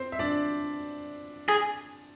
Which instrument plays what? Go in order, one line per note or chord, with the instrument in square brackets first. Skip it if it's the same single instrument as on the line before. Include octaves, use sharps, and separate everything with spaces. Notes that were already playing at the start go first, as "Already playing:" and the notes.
Already playing: [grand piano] C4 C5
E5
D4 D5
[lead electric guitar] G#4